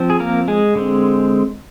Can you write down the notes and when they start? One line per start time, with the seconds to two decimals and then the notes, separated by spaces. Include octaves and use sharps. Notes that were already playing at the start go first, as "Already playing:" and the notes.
Already playing: F3 C4
0.10 G#4
0.20 A#3 A#4
0.48 G#3 G#4
0.75 D3 G#3 C4